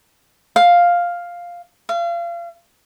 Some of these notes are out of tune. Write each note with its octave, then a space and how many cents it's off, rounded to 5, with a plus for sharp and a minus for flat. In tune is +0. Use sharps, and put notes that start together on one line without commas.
F5 +5
F5 -35